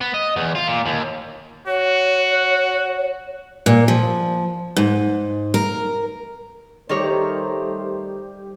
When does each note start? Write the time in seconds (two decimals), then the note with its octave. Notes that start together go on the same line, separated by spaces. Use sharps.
0.01 B3
0.14 D#5
0.36 E2
0.55 F4
0.67 A#2
0.86 D#2
1.67 F#4 C#5
3.66 A#2
3.88 F3
4.77 G#2
5.54 A#4
6.89 D#3 G3 A3 D#4 G4 A#4 C5 C#5